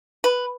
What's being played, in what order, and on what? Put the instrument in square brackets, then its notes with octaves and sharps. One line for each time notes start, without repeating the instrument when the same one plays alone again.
[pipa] B4